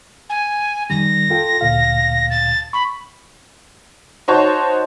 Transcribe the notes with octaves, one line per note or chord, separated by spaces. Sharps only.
G#5
F2 D#3 G3 A#6
F4 A4 G5
D2 A#2 F5
A6
B5 C#6
D#4 F#4 C5 C#5 A5